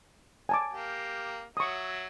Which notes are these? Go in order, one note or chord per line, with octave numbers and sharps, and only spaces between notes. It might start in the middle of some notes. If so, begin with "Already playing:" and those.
G#5 A5 D6
A#3 G4
F#3 E5 C#6 D#6